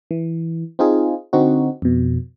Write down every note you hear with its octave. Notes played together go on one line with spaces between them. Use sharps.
E3
C4 D#4 F4 G#4
D3 C4 D#4 F#4
F2 B2